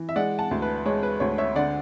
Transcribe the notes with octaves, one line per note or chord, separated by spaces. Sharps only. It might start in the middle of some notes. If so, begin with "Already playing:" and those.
Already playing: E3
E5
G#3 D5 F#5
F#5 A5
D2
B4
G#3 C#5
B4
D2 C#5
C#5 E5
D3 D5 F#5